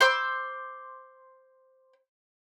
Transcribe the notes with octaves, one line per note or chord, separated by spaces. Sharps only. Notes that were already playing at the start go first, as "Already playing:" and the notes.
C5 D6 E6